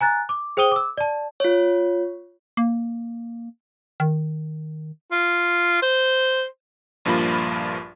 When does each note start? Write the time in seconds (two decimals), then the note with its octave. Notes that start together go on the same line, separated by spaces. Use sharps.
0.01 G#5 A#5 F#6 A6
0.29 D6
0.57 G#4 C5 G5 D#6 D#7 G7
0.72 D6 E6
0.97 D5 A5
1.40 F4 C#5
2.57 A#3
4.00 D#3
5.11 F4
5.82 C5
7.05 A#1 G2 F3 A#3 F4 B5